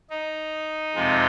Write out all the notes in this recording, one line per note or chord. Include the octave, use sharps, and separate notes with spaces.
D#4
F2 C3 F3 G#3